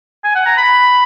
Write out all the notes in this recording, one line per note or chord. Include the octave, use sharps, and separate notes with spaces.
G#5
F#5
A#5
B5